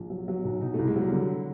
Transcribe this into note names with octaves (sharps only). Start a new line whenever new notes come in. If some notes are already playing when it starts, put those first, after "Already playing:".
Already playing: A#1
F#3
F#3
B1
B2 D#4
A3
C2
G#3
F#3
G3
D3